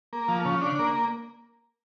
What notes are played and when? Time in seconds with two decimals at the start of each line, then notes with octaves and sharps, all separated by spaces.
0.13 A#3
0.28 F3
0.45 C#3
0.61 D4
0.79 A#3